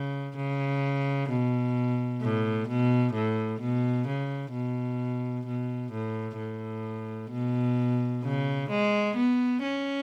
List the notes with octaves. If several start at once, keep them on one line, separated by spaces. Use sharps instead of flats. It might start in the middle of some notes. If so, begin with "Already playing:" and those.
Already playing: C#3
C#3
B2
A2
B2
A2
B2
C#3
B2
B2
A2
A2
B2
C#3
G#3
B3
C#4